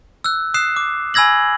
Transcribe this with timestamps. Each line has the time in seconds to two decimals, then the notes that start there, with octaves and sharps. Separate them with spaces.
0.24 E6 F#6
0.54 D#6 F#6 C7 E7
0.76 D6
1.14 G#5 B5 E6 G#6 A#6 F#7